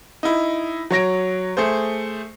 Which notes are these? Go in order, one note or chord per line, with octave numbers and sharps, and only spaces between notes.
D#4 E4
F#3 C#5 A#6 D7
A3 G#4 C5